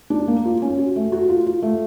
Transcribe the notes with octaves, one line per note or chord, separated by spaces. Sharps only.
D4
A#3
F4
C#4
F#4
A3
F#4
F4
F4
A3